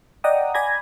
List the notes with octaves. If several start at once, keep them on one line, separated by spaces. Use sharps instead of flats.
D5 D#5 F#5 G5 A#5 D#6
D5 G#5 B5 G#6 A#6